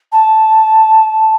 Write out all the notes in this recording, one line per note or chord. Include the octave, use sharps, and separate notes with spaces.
A5